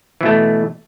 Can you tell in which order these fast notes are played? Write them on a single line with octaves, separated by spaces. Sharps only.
E3 B2 A3